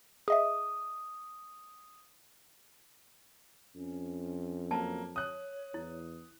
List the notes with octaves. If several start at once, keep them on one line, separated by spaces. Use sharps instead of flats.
G#4 D#5 E5 D#6
F2 C#4
F#3 A#3 A5
C#5 D#6 F#6
E2 E4